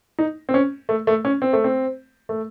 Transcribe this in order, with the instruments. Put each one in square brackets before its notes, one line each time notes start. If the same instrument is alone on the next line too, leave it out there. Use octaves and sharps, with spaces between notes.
[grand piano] D#4
C4
C#4
A3
A3
C#4
C4
A3
C4
A3